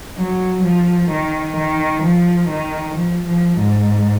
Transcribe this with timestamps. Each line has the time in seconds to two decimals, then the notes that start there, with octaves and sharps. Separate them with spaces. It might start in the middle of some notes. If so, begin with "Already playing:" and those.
0.18 F#3
0.64 F3
1.10 D#3
1.57 D#3
2.03 F3
2.49 D#3
2.96 F3
3.27 F3
3.58 G#2